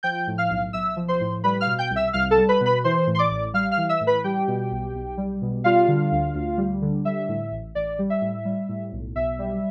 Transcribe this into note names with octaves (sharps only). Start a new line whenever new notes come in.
F3 G5 G6
A2
F5 F6
B1
B1 E5 E6
F3
C5 C6
A2
G3 B4 B5
F5 F6
B2
G5 G6
C2
E5 E6
C2 F5 F6
A4 A5
G3
B4 B5
B2
B4 B5
E3 C5 C6
A2
C6
D5 D6
A1
G3 F5 F6
F5 F6
E3
E5 E6
A2
B4 B5
G3 G4 G5
B2
B1
B1
G3
B2
G3 F4 F5
D3
D2
D2
G3
D3
G3 E5
A2
A1
A1 D5
G3
E5
A2
G3
A2
B1
B1 E5
G3